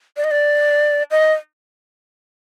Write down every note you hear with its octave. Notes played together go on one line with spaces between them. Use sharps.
D5
D#5
D5
D#5